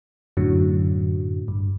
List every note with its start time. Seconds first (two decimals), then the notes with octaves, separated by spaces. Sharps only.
0.37 F#2 A2 D3 F#3
1.48 G2